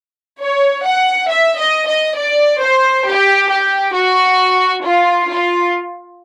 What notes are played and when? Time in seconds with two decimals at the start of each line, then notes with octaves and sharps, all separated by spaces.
0.41 C#5
0.85 F#5
1.29 E5
1.59 D#5
1.88 D#5
2.18 D5
2.62 C5
3.07 G4
3.51 G4
3.95 F#4
4.84 F4
5.29 F4